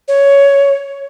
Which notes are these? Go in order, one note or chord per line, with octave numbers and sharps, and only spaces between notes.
C#5